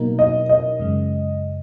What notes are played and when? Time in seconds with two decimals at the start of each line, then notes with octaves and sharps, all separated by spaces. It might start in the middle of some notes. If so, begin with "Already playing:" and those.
Already playing: B2 F#3 A#3 D#4 A#4
0.19 D#5
0.49 D#5
0.80 F#2 C#3 G#3